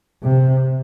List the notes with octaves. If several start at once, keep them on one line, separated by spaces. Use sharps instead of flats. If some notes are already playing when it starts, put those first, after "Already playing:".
C3